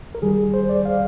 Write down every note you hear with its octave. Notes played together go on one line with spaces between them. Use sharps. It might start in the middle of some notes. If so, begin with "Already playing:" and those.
A#4
D#2 D#3 G3 G#4
C5
D5
F5